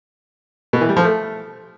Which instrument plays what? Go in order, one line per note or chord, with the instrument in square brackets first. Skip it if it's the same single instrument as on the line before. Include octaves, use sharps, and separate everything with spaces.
[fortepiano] B2
E3
G3
F3
A3